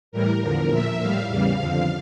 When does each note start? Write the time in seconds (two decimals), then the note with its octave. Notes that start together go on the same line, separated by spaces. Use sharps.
0.12 A2 E3 G3 A#4
0.41 E2 D3 F3 A#4
0.70 A#2 F3 E5
0.99 A2 G3 F5
1.28 E2 C#3 E3 G3 F5
1.57 F2 D3 F3